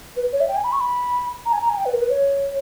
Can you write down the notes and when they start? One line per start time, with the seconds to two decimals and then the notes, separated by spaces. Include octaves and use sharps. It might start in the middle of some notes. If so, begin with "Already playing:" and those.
0.16 B4
0.33 C#5
0.41 E5
0.48 G5
0.56 G#5
0.64 B5
0.72 C#6
0.80 B5
1.46 A#5
1.53 G#5
1.62 A#5
1.70 G#5
1.77 G5
1.86 B4
1.93 A#4
2.01 B4
2.10 C#5